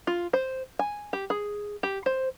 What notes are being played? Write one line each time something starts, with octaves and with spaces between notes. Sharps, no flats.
F4
C5
G#5
G4
G#4
G4
C5